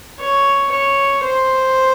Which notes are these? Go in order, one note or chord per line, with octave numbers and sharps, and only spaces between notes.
C#5
C#5
C5